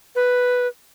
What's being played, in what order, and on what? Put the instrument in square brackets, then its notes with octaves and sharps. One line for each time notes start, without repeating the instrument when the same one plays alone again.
[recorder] B4